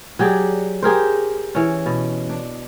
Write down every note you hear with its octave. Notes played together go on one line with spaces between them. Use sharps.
F#3 G4 G#4 D5
G4 G#4 A#4 C5
E3 C#4
B2
D4